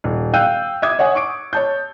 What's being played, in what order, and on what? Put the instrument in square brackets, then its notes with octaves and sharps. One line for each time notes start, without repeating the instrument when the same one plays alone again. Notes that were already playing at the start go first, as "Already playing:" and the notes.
[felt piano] D#1
F5 G5 E6 F#6 G6 D#7
E5 D6 D#6 G#6
C#5 E5 F#5 G#5
C#6 D6 D7
C#5 A5 G6